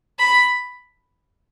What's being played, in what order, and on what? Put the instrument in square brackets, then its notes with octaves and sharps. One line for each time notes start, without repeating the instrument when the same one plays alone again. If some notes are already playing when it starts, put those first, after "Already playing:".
[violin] B5